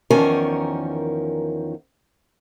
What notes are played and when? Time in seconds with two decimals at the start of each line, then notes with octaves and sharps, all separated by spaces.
0.10 E2 D#3 F3 C#4 A#4 G#5